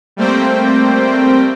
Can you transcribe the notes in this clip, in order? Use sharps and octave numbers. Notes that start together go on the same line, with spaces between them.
G3 A3 A#3 C4 C5 G5